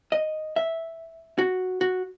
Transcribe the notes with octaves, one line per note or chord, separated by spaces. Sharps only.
D#5
E5
F#4
F#4